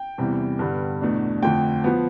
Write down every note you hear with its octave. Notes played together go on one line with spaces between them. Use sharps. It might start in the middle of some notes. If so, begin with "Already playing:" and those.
Already playing: G5
E2 C3 E3 G3
G2 D3 G3 B3
E2 B2 A3 D4
F2 D3 A3 G5
F3 B3